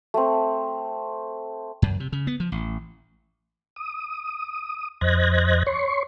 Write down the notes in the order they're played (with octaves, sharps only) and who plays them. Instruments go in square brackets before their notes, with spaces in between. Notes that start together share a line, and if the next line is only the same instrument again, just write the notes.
[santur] A3 C4
[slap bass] F#2
C3
C#3
B3
F3
A1
[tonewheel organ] D#6
F2 C5 D#5 F#6 G#6 A#6
C#5 C6 C#6